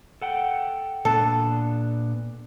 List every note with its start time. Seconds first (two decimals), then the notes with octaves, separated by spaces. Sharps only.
0.22 A4 F#5 G5
1.05 A#2 B3 D4 A4